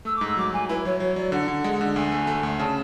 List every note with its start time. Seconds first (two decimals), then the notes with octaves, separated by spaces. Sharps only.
0.05 A3 E6
0.16 D6
0.21 G#2
0.27 E6
0.37 F#3 D6
0.53 F#3 G#5
0.69 E4 B4
0.85 F#3 C#5
1.00 F#3 C#5
1.16 F#3 D5
1.32 D3 F#5
1.48 D3
1.64 G#3
1.81 D3
1.96 D2 G#5
2.12 A3
2.27 A3
2.43 D2
2.59 C#3 A5